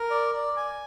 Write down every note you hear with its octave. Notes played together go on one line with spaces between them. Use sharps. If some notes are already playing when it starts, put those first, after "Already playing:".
Already playing: A#4
D5
D5
G#5